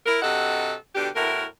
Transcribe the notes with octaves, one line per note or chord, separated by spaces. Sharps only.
E4 A#4
G2 C3 F#4 A4 D#5 F#5
B2 D3 D4 G4
E2 A2 E4 F#4 A#4